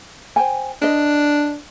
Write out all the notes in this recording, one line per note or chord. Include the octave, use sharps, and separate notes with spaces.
C5 G5 G#5
D4 B4 D#5